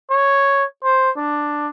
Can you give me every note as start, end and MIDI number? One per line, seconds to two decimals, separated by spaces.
0.10 0.64 73
0.84 1.10 72
1.17 1.68 62